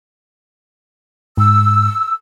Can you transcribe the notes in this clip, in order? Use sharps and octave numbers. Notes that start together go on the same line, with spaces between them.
G#2 E6